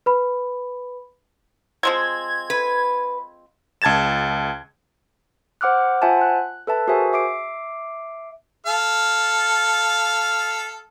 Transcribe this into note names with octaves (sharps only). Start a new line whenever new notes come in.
B4 B5
F3 G#3 C4 G#6
B4
C#2 A5 G#6 A6 E7
C5 F#5 D6 F6 F#6
F4 C5 E5 F#5 G#5 A5
F#6
A4 B4 E5 A5
F#4 G#4 A#4 C5 E5 G#5
E5 D6 C7 D7
A4 F5